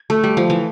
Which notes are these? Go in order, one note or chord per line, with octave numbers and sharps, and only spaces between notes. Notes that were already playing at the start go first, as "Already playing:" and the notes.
Already playing: B3
A3
G3
F3
E3